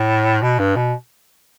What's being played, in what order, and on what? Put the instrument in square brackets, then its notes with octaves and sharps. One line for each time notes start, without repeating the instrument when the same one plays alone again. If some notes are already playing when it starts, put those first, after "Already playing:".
Already playing: [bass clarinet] A2
B2
G2
B2